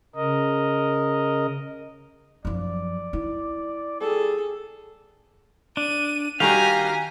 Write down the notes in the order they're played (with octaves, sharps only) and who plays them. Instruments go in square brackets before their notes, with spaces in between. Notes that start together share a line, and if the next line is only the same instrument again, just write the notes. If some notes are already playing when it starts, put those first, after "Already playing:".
[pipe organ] C#3 A#4 D#5
[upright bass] F#2 F3 [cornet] D5
[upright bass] E4
[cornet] G3 [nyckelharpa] G#4 A4
[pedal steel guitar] D4 [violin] D#7
[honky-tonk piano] D#3 G3 F#4 [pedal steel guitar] G4 F5 [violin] G#5 [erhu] A#5